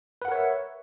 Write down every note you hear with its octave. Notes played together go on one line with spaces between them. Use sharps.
A#4 B4 C#5 E5 F#5